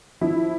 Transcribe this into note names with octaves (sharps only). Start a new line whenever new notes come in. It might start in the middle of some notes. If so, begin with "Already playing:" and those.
F3 E4